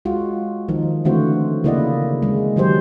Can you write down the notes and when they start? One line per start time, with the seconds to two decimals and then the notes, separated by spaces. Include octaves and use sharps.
0.05 G#3 F4 F#4
0.68 D#3 F3 D#4
1.05 D3 E3 A3 C4 F#4 C5
1.64 C#3 A#3 E4 D5 D#5 F#5
2.23 G#3
2.56 D#3 F#3 G4 C5